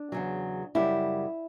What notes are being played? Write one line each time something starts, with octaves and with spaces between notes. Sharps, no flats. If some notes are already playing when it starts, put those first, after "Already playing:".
Already playing: D4
E2 C#3 F#3
F#2 C#3 G3 E4